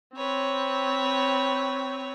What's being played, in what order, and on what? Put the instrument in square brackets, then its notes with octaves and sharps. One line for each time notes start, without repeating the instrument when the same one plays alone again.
[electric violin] C4 [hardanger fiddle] B4 C#5